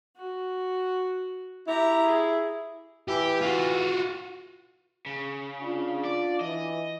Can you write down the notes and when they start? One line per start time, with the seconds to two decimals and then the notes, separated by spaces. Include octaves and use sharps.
0.17 F#4
1.67 E4 G4 A#5
2.06 G#4
3.08 E3 G4
3.42 F4 F#4
5.06 C#3
5.61 D4 F4
6.05 D5
6.41 E3 D#5